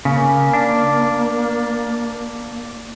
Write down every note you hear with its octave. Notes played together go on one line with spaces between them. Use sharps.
C#3 A#3
D4